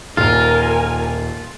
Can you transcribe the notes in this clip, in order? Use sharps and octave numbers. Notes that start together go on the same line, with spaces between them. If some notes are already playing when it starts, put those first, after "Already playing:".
D#1 F4 A#4 G#5